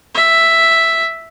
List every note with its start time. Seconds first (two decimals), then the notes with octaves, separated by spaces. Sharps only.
0.15 E5